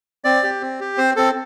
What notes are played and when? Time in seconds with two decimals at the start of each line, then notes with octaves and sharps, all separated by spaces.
0.24 C4 D5
0.43 G4
0.61 C4
0.80 G4
0.98 C4 C5
1.16 C4 A4